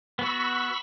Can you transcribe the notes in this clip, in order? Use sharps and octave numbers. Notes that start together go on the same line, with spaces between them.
B3 F#4 B5 C#6 E6